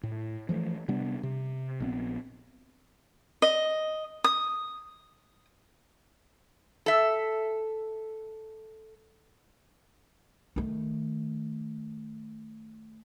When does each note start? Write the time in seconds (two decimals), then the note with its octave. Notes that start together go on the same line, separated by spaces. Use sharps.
0.03 A2
0.49 E3 F3 A3
0.88 C3 G3 B3 D4
1.23 C3
1.80 A#1 B3 C4
3.42 D#5
4.24 D#6
6.86 A4 E5
10.56 D#3 A3